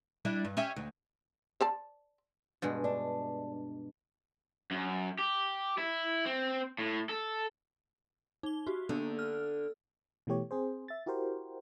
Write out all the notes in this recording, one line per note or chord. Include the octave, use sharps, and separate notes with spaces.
G3 D4 E4
G2
C#4 G4 E5
D2
C5 D5 A5
G2 B2 G#3
D4
F#2
G4
E4
C4
A2
A4
D#4 G7
F#4 G4
D3 A#3 B3 D4
F6
B2 E3 A3 G4 C#5
C4 G#4 C5
E5 A6
E4 F#4 G4 A#4 C5